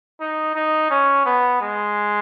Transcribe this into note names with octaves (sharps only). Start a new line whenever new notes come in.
D#4
D#4
C#4
B3
G#3